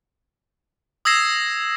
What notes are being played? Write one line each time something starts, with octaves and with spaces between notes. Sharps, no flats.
D#6 E6 G#6 A#6 C7 E7